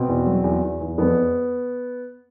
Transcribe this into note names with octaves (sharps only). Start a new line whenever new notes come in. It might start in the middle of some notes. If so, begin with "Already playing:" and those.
Already playing: B2 C4
E2
F#3
E2
E2
E2
F2 B3